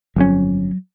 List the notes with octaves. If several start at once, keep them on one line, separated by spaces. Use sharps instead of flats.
G1 F2 F#3 C#4